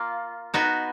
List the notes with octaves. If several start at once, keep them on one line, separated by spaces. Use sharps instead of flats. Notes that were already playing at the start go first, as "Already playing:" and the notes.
Already playing: A#3 F4
B3 D#4 F#4 B4